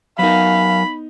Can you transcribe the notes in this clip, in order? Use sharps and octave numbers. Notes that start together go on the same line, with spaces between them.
F#3 B3 D#4 A#4 F5 B5